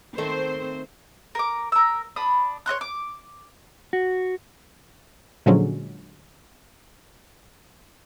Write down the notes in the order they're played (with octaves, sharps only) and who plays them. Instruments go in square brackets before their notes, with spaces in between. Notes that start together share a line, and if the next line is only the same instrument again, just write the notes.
[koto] D#3 A3 [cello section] C4 C5
[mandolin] A#4 D6
A#4 E6
D4 B5 D#6
C#5 D#5 C6 F#6
D6
[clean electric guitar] F#4
[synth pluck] A#2 D3 F3 F#3 G#3 C#4